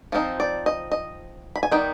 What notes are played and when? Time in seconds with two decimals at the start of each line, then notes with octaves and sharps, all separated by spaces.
0.12 F3 C4 D#4 F4
0.40 D5
0.66 D#5
0.92 D#5
1.56 B5
1.63 G#5
1.72 D#3 G3 B3 D#4 G5